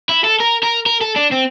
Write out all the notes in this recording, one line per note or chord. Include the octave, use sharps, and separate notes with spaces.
E4
A4
A#4
A#4
A#4
A4
D4
C4